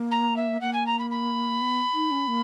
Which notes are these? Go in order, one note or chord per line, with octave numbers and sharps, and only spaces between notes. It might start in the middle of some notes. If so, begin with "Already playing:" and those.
Already playing: A#3
A#5
E5
A#3 F#5
G#5
A#5
B5
B5
B3
D#4
C#4
A#3